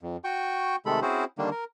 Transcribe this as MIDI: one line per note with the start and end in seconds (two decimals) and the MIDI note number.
0.01 0.17 41
0.24 0.76 66
0.24 0.76 79
0.24 0.76 85
0.86 1.00 48
0.86 1.00 51
0.86 1.00 56
0.86 1.00 57
0.86 1.00 69
0.86 1.00 83
1.02 1.24 60
1.02 1.24 61
1.02 1.24 64
1.02 1.24 66
1.02 1.24 68
1.02 1.24 72
1.38 1.50 50
1.38 1.50 51
1.38 1.50 55
1.38 1.50 58
1.38 1.50 62
1.51 1.64 70